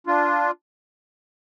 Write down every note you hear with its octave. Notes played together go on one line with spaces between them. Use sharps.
D4 F4